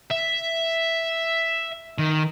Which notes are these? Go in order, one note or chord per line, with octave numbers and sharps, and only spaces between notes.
E5
D#3